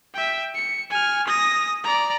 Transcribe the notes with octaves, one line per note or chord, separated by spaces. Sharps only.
E5 G5
C#7
G#5 F6
D#6 A#6
D5 A#5